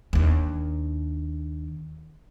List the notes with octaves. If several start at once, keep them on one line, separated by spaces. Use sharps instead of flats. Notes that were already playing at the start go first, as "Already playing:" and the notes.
D#2 D4